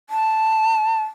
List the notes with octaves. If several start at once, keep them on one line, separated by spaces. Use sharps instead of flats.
A5